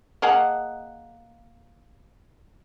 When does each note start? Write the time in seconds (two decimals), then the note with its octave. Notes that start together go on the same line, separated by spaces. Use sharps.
0.22 A#3 G#4 D#5 F#5